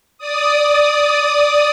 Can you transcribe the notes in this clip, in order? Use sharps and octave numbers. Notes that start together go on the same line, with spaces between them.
D5 D#6